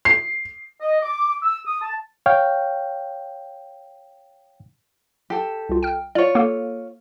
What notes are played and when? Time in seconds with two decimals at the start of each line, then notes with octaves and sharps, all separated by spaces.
0.05 C7
0.81 D#5
1.02 D6
1.42 E6
1.65 D#6
1.82 A5
2.26 C#5 F5 G5
5.30 G4 A4
5.69 C2 F4
5.83 G5 F6
6.15 F4 C#5 D5
6.35 A#3 A4